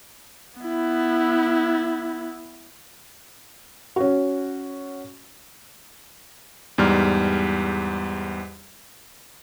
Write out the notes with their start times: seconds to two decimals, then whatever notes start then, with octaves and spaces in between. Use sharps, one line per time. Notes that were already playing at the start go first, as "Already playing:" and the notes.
0.60 B3 E4
3.96 C#4 F#4
6.78 E2 G#2 G3 F6